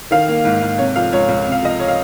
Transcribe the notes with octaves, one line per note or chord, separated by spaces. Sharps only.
D#3 F5
A#3
G#2
G#2
C3 C#5
F3 F5
C#2 C#5
C#2
C3
F5
F3 D#5
C#5
F5